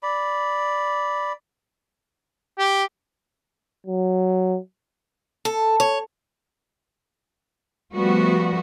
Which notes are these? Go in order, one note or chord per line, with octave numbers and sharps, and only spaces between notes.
D5 B5
G4
F#3
A4
C#5
F3 G3 A3 B3 F#4